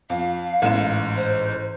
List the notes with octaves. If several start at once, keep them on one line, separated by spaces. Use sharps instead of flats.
F2 F5
A1 G#2 E7
C5